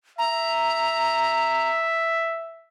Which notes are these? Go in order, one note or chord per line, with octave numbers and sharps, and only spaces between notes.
E5 A#5